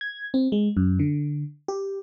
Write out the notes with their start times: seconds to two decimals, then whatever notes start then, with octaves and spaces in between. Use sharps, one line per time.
0.01 G#6
0.34 C4
0.52 G#3
0.77 F#2
0.99 D3
1.68 G4